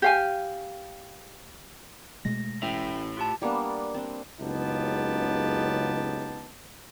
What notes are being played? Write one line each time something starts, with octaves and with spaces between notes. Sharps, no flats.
G4 F5 G#5
B2 G#3 A3 A#6
A1 A2 E5 G5
F4 G4 A5
G3 A#3 B3 D4
C4 D4
F#1 C#2 B3 D#4 G4 A5